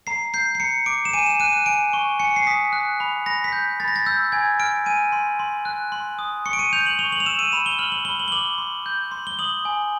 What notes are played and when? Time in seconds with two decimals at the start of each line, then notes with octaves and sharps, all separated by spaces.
0.07 A#5 C7
0.34 G6 C7
0.55 C7
0.60 A#5 C#7
0.86 D6 D7
1.05 E7
1.13 G#5 D#7
1.26 E7
1.40 F#6 D#7
1.53 D#7
1.66 G#5 D7
1.93 C#6
2.20 G#5 C#7
2.36 C7
2.47 D#6 B6
2.73 F#6
3.00 B5
3.26 B5 A#6
3.44 B6
3.52 G6
3.80 B5 A6
3.88 A#6
3.96 A6
4.06 E6 G6
4.32 G#5 G#6
4.60 F6 D7
4.86 G#5 D#7
5.12 C6
5.39 C6
5.65 F#6
5.92 C6
6.19 D#6
6.46 C#6 C#7
6.53 D7
6.59 D#7
6.73 G6 F7
6.86 F#7
6.99 C#6 F7
7.12 F#7
7.20 F7
7.26 E6 E7
7.39 D#7
7.52 B5 E7
7.66 G7
7.79 F6 F#7
7.92 F#7
8.05 B5 G7
8.19 F#7
8.28 G7
8.32 D6 F#7
8.58 C6
8.86 G6
9.11 C6
9.27 G7
9.39 D#6 F#7
9.65 G#5